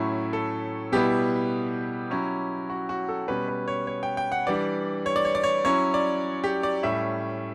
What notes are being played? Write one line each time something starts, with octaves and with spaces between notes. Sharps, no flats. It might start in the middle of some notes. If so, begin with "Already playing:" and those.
Already playing: A2 F#3 A3 C#4 E4 E5
A4
B2 G3 B3 E4 G4
F#3 C#4 E4
F#4
F#4
A4
B2 G3 C#4 B4
B4
C#5
C#5
G5
G5
F#5
E3 G3 D4 D5
C#5
D5
C#5
D5
C#5
F#3 C#4 E4 C#5
D5
G4
D5
A2 G3 C#4 E5